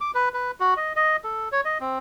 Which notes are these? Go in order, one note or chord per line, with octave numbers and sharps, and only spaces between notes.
D6
B4
B4
F#4
D#5
D#5
A4
C#5
D#5
C4